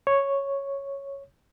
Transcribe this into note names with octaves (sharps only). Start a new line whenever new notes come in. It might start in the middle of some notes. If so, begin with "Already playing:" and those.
C#5